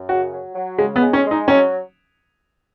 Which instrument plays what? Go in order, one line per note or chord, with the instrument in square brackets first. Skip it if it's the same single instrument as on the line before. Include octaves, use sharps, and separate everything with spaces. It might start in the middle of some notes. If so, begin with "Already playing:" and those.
Already playing: [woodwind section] F#2
[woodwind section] C#3 [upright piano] F#4
[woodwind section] F#3
F#3
[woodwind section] C#3 [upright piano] G#3
[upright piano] B3
[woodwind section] G#3
[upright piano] C#4
[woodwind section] G#3
[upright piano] D#4
[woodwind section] F#3 [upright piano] C#4